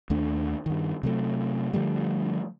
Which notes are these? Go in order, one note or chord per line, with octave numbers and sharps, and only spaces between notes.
D#2 A3 D4
G2 D#3
C3 F#3 A3
D3 F3 G3 A3